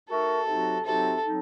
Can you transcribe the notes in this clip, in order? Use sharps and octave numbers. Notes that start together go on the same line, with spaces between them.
A3 D#4 F#4 A4 A#4
C3 F#3 C4 D#4 F#4
C3 F#3 C4 D#4 F#4 A4
F#3 C4 D#4